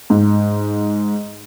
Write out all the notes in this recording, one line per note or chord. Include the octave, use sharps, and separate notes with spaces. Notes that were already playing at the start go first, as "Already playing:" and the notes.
G#2